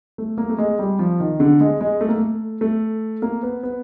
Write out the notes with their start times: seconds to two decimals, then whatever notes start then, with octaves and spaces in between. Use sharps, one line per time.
0.18 A3
0.38 A#3
0.49 A3
0.58 G#3
0.79 G3
0.99 F3
1.20 D#3
1.40 D3
1.61 G#3
1.81 G#3
2.01 A3
2.09 A#3
2.18 A3
2.61 A3
3.22 A#3
3.43 B3
3.63 B3